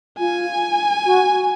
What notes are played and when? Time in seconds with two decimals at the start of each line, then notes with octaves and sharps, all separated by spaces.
0.19 F4 G#5
1.05 F#4